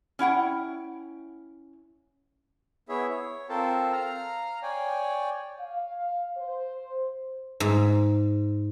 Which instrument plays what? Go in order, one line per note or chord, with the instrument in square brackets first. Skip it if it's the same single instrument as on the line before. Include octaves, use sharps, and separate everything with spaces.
[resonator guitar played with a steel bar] C#4 E4 F#5 G5
[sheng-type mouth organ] B3 E4 G#4 C#5 E5
C#5
C4 F4 A4 A#4 C5 A5
F5 A#5 F6
C#5 D5 G5 G#5
[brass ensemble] F5
C5
[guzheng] G#2